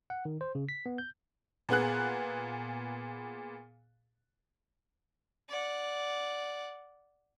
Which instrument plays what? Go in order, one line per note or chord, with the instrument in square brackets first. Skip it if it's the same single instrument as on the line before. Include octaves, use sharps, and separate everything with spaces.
[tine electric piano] F#5
D#3
C5
C#3
B6
B3
G6
[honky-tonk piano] A#2 B3 G#4 F#6
[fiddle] D5 F#5